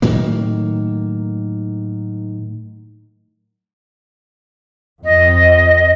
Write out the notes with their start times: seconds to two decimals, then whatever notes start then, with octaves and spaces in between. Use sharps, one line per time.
0.02 A2 D#3 F#3 A#3
5.03 F2 D#5